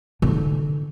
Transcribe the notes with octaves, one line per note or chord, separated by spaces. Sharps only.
D3 D#4